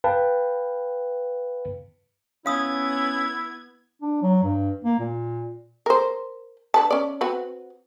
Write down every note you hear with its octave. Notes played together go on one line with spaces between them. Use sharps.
B4 F5 G5 A5
B3 C#4 E4 F5 D#6 E6 G#6
D4
F#3
G2
A#3
A#2
A#4 C5
D3 B4 A5
C#4 D5
C4 F#4 B4